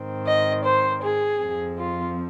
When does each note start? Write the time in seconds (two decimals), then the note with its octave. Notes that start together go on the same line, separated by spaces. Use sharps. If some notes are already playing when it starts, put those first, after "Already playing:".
Already playing: G#2 D#3 C4
0.26 D#5
0.64 C5
1.02 G#4
1.39 F2 F3 C4
1.77 F4